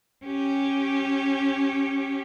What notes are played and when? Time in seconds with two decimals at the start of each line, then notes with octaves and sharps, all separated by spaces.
0.25 C#4 G4